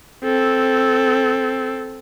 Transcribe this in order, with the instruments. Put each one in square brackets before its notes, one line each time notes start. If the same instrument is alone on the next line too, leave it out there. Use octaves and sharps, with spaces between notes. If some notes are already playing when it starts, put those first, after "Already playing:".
[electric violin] C4 A4